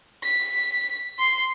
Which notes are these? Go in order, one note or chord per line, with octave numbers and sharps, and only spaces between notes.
B6
C6 C7